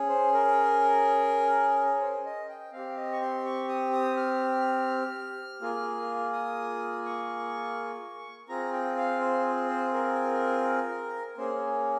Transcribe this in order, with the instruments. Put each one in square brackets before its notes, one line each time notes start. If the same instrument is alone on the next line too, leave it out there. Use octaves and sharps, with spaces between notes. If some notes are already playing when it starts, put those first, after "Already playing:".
Already playing: [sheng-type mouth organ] C#4 G#4
C5
A#4
C5
D#5
G5
C4 G4 F5
D#5
C#6
C6
C#6
D#6
D#6
F6
A#3 F4 G#4
D#6
C#6
C4 F4 G#4 A#5
G5
F5
C5
C5
A#4
A#3 C#4 G#4 C5